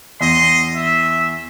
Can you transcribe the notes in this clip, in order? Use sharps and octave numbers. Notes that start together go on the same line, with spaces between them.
E2 D#5 C6
E5